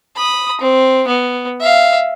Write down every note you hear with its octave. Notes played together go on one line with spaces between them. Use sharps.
B5 D#6
C4
B3
E5 F5